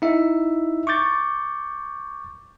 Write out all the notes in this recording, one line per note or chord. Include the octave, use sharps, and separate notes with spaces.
D#4 E4 E5
C#6 D6 G6 A6